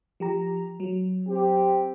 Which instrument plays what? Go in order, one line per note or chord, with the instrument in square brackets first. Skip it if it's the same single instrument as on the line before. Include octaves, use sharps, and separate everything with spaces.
[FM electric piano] F3 G4 A#5
F#3
[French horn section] C4 G4